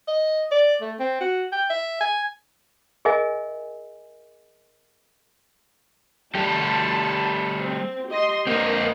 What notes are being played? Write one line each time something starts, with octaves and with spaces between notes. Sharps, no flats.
D#5
D5
A3
C4
F#4
G5
E5
G#5
G#4 A#4 D#5 E5 G#5
G3 A3 G4 A5
C4
G4 D#5 C6
A#3 C4 D4 A#4 D#5